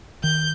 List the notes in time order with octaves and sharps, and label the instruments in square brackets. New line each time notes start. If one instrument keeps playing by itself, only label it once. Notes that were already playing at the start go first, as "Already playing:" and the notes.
[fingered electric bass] D#3 [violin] G6